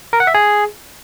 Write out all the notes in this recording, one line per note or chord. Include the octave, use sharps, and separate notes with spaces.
A#4
F#5
E5
G#4